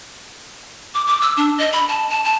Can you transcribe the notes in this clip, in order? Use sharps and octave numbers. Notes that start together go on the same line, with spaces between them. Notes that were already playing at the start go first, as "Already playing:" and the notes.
D6
D6
E6
D4
D#5
B5
A5
A5
A5